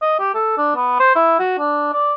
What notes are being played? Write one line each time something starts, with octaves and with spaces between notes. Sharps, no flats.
D#5
G4
A4
D4
B3
C5
E4
F#4
D4
D5